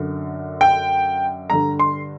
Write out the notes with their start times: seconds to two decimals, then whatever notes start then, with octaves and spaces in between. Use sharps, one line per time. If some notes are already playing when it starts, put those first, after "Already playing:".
Already playing: F#2 D3
0.61 G5
1.50 G2 D3 A#5
1.79 C6